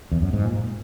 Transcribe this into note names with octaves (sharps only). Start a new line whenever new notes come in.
E2
F#2
G#2
A#2